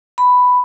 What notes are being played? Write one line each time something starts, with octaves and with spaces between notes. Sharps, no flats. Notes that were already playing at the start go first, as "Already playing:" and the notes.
B5